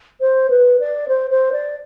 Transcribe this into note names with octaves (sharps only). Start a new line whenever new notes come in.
C5
B4
D5
C5
C5
D5